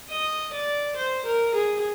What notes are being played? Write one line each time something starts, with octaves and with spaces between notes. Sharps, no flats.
D#5
D5
C5
A#4
G#4